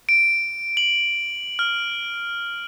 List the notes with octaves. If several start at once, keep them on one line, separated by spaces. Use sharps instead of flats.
D7
F#7
F6